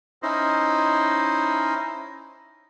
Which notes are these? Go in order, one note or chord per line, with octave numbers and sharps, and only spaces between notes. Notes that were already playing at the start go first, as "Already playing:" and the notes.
C#4 D#4 E4 C5 D#5